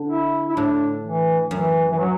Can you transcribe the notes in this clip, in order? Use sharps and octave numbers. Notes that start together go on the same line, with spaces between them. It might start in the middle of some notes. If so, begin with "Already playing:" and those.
Already playing: D3
E4
E4
A2 D4
E3
F#2 E3
E3
F#3